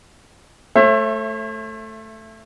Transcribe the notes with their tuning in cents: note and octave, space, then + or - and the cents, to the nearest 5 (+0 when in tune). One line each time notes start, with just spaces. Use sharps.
A3 +0 C#5 -45 E5 +20